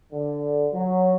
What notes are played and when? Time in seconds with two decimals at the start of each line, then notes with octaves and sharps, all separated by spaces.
0.12 D3
0.72 F#3